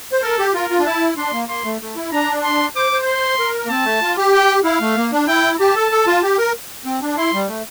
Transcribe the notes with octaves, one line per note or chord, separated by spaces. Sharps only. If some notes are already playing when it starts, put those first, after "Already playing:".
C5
A4 A#4
G4
F4 A#4
F4
D4
E4 A5
D4 C6
A#3
A#3 C6
A3
A3
E4
D4 A#5
C6
C5 D6
C5
C6
A#4
A#3
C4 A5
A3
F4
G4
G5
E4 F5
A3
A#3
D4
E4 G5
G4 A5
A4
A4
F4
G4
A#4
C4
D4
E4 C6
G3
A3